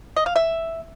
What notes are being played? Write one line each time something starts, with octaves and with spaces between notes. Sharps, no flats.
D#5
F5
E5